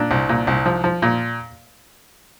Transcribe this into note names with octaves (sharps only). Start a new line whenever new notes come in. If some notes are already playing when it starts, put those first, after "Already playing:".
Already playing: A#2 D4
C2
A#2
C2
F3
F3
A#2